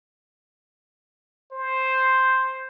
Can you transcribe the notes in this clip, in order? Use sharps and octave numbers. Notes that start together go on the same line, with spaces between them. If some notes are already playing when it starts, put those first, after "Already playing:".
C5